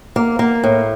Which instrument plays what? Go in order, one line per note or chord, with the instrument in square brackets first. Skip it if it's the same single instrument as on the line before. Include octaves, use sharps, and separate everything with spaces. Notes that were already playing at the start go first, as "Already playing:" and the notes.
[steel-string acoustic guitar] A#3
A#3
A2